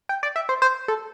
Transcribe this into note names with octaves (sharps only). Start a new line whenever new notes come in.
G5
D5
E5
C5
C5
A4